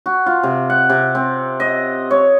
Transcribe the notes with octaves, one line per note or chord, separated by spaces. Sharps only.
F#4
F4
C3
F#5
C3
C4
D#5
C#5